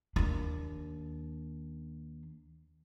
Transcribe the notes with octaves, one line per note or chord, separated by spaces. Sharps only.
D#2 D4